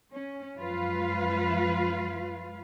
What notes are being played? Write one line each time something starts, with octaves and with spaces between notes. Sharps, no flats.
C#4
F#2 F3 G#3 F4 B4 F5